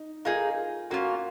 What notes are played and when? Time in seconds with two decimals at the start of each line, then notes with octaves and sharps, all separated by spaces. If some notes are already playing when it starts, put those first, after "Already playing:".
Already playing: D#4
0.25 A#3 D#4 F4 G#4
0.90 A#3 C#4 F4 F#4